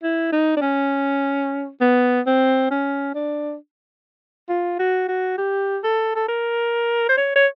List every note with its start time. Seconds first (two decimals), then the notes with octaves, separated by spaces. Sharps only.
0.03 E4
0.32 D#4
0.57 D4
0.62 C#4
1.81 B3
2.26 C4
2.71 C#4
3.15 D4
4.49 F4
4.79 F#4
5.08 F#4
5.38 G4
5.84 A4
6.16 A4
6.28 A#4
7.09 C5
7.17 C#5
7.35 C#5